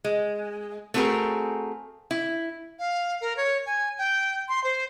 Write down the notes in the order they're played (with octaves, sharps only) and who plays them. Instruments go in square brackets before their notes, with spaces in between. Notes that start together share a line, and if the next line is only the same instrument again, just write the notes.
[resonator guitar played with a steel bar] G#3
A3 C4 F#4 G#4 A#4
E4
[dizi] F5
A#4
C#5
G#5
G5
C6
C5